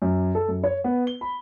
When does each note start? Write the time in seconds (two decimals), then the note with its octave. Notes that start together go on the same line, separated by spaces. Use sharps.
0.02 F#2
0.35 A4
0.48 F#2
0.64 C#5
0.84 B3
1.07 G7
1.21 B5